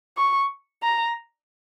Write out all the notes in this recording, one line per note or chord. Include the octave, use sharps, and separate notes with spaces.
C#6
A#5